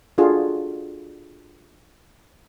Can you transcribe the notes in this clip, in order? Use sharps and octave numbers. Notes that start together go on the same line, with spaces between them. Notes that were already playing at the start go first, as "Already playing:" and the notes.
D4 F4 F#4 G#4 A4